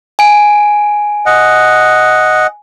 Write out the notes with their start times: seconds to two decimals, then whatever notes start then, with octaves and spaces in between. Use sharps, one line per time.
0.19 G#5 D7
1.26 D#5 F#5